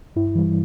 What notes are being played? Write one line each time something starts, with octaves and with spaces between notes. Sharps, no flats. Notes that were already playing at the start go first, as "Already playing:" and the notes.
G2 E4
E3 G3